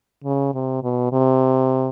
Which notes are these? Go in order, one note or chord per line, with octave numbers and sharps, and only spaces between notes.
C#3
C3
B2
C3